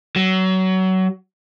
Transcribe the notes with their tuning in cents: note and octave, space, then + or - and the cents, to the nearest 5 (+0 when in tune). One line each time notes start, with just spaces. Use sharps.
F#3 +25